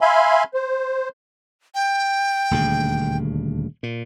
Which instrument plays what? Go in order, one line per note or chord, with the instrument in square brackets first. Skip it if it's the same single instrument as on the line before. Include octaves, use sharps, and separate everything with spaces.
[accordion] E5 F5 G#5 B5 C6
C5
[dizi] G5
[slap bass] D#1 D2 C#3
A#2